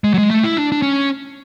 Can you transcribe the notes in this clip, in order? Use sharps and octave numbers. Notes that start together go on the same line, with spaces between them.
G#3
F#3
G#3
A3
E4
D4
D4
C#4